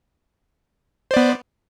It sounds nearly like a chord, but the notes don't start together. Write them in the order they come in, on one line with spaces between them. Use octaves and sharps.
C5 D5 B3